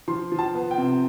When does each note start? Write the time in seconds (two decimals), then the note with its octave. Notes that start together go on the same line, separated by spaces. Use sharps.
0.08 F3 C6
0.32 F3
0.39 A5
0.55 B3
0.71 G5
0.78 C3